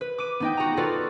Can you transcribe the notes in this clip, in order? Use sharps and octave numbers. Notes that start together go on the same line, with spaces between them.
B4
D6 D#7
B3 D#4 G5
F#4 A#5
F4 F#4 A4 B4 D5